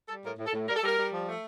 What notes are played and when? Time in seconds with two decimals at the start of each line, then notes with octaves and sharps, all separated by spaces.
0.09 G3 A4
0.23 A2 A#4
0.38 A2
0.47 A4
0.53 A2
0.68 G3 A#4
0.76 A4
0.83 G3 A#4
0.98 G3
1.13 F3
1.28 A3